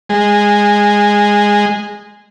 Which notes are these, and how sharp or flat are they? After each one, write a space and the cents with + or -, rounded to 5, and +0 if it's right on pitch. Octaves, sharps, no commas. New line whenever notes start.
G#3 -15